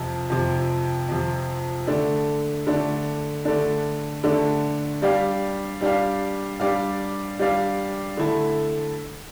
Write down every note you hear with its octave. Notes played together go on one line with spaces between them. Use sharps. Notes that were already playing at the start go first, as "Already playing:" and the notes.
Already playing: F2 C3 F3
F2 C3 F3
F2 C3 F3
D3 A3 D4
D3 A3 D4
D3 A3 D4
D3 A3 D4
G3 D4 G4 D5 F5
G3 D4 G4 D5 F5
G3 D4 G4 D5 F5
G3 D4 G4 D5 F5
D3 A3 E4 A4